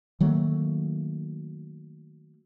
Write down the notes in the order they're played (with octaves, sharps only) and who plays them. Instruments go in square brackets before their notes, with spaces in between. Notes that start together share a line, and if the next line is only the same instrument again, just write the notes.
[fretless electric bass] D#3 F#3 A3 A#3